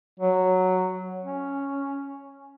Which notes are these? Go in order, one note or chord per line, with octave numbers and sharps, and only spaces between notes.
F#3
C#4